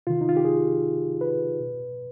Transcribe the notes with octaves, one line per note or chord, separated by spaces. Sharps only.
C3 D#3 F4
D#4
F4
G4
G#4
B4
B2